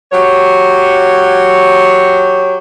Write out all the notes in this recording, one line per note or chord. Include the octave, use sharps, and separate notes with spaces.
F#3 G4 C#5